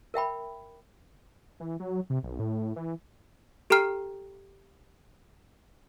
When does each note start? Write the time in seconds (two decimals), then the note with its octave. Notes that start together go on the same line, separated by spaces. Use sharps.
0.14 A#4 E5 G5 B5
1.60 E3
1.80 F#3
2.10 C3
2.23 B1
2.39 A2
2.76 E3
3.70 G4 A4 G5 A#5 F6 C7